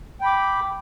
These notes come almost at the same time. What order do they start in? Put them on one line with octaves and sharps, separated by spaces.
G5 B5 D6